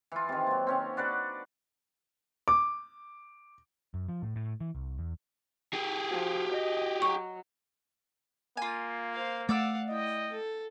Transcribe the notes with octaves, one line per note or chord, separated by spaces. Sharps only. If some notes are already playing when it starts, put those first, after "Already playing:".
E3 F4
C3 D#3
F#3 A#3
C4 C#4 F5
D4 F#4 B4 D5
D6
F#2
F3
A2
A2
E3
C2
E2
G4 G#4
F3 F#4
D#5
F#3 C#6
A#3 F4 G#5
C5 F5
A3 D5 F5 F#5 D6 E6
E4 D#5 G5
A4